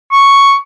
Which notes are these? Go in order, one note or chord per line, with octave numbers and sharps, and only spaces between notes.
C#6